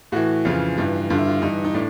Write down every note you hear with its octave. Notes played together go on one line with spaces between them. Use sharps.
A2 E3 F#4
F2 C#3 E3 F4
G2 E3
G2 D3 F4
E4
F4
G2 E3 D#4
D#4
A2 D4